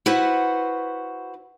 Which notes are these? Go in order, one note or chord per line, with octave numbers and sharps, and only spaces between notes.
E4 F#4 B4 C5 F#5